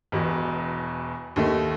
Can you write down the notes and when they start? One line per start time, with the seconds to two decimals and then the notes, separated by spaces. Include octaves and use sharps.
0.12 E1 E2 B2
1.36 D#2 D#3 A3